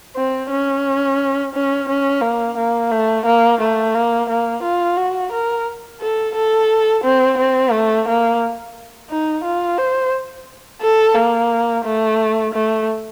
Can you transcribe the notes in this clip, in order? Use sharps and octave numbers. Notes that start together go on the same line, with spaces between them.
C4
C#4
C#4
C#4
A#3
A#3
A3
A#3
A3
A#3
A#3
F4
F#4
A#4
A4
A4
C4
C4
A3
A#3
D#4
F4
C5
A4
A#3
A3
A3